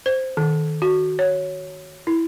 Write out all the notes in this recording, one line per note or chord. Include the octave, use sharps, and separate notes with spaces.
C5
D#3
F#4
C#5
E4